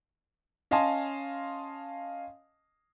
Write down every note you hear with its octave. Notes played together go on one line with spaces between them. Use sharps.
C#4 D#5 F5 G#5 A5 C6